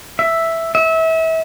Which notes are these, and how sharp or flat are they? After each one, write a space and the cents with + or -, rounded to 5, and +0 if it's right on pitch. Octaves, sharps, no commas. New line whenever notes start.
E5 +0
E5 -30